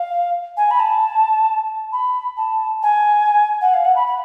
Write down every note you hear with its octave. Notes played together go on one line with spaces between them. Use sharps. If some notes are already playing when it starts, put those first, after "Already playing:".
Already playing: F5
G#5
B5
A5
B5
A5
G#5
F#5
F5
F#5
B5
B5